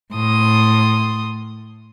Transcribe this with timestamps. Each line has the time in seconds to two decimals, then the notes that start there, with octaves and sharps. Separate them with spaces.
0.13 A2 C6 D#6